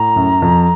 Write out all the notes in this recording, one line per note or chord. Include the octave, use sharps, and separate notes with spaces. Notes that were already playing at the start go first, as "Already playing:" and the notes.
Already playing: A2 A#5
F#2
F2